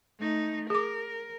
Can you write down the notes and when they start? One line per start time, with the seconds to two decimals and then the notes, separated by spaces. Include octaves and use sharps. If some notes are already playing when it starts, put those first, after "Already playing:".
0.20 A3 D#4
0.70 G#4 A#4 D6